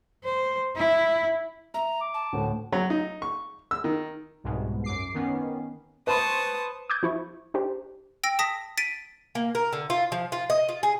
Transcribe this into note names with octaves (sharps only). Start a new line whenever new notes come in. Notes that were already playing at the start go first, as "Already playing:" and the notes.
C5
E4
E5 A#5
D6
A5
D2 A2
F#3
D#4
C#6
E6
D#3
C2 G#2 B2
F#2 D6 C7
D#3 B3 C#4
B4 C5 A5 C6 C#6 D#6
D6 D#6 G6 G#6
F3 E4 C#6
D4 G4 C5
G5 E6 A#6 D7
A5 D#6 A#6 B6
A6 B6 D7 D#7
A#3
A#4
D3
F4
F3
F4
D#5
F4
G#4